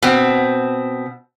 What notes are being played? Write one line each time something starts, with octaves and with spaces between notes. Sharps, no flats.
B2 C4